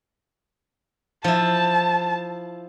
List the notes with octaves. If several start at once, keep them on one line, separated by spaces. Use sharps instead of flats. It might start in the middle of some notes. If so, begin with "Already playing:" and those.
F3 E4 A5